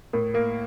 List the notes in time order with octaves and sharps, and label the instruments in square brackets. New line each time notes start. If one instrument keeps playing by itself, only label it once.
[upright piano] A2 [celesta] A#4
[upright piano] A#3 [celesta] A#4